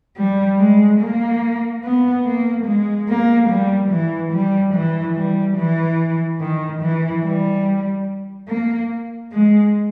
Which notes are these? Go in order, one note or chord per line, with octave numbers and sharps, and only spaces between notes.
G3
G#3
A#3
B3
A#3
G#3
A#3
G3
E3
G3
E3
G3
E3
D#3
E3
G3
A#3
G#3